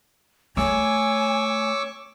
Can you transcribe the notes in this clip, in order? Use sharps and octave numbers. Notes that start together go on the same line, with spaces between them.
A3 C#5 G#5 C#6 D6 E6